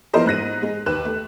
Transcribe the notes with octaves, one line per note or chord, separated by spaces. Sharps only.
F3 B3 E4 A#4 C5 D#5
G#2 F#6 A#6 D#7
G#3
D#2 B4 F#6 E7
A3